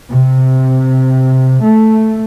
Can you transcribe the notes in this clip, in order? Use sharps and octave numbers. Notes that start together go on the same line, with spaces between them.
C3
A3